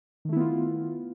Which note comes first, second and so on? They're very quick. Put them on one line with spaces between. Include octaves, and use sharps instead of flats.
D#3 A3 E4 B3 F4